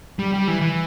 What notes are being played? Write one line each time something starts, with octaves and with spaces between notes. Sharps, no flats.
G3
G3
E3
E3